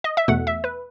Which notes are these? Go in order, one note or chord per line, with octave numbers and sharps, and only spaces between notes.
D#5
E5
E2 B2 A3 F#5
E5
B4